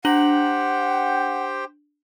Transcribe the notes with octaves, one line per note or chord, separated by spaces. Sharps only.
D4 G4 C5 F#5 G5 F#7